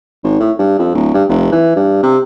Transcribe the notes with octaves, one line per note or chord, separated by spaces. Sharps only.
G#1
A2
G2
F2
D1
G2
F1
E3
G2
C3